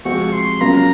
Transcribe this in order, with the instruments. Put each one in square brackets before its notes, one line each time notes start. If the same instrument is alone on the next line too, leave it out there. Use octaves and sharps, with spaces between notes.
[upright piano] C3 F3 G#3 C4 F#4 [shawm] C#6
[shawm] C6
[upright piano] C#3 F#3 A#3 F4 [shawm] A#5